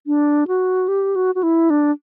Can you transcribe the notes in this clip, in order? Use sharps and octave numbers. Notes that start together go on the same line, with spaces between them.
D4
F#4
G4
F#4
F#4
E4
D4